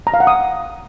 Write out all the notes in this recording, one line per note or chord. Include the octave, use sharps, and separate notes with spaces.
A#5
F5
F#5
D#6